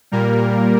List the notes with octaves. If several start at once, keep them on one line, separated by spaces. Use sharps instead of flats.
A#2 G3 A#3 A#4